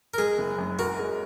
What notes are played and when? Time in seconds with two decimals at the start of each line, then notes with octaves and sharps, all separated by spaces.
0.14 A#4
0.18 G#3 G#4
0.38 F#1
0.58 F#2
0.79 F#4 A#4
0.99 G#3